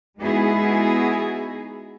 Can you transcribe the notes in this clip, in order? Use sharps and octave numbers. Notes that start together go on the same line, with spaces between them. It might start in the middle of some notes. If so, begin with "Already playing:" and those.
G#3 B3 D#4 E4 F#4 G#4